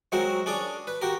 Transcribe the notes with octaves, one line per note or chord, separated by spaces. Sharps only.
F#3 G#3 C4 F#4 A#4
C#4 D4 G#4 D5
B4
F#4 G4 A#4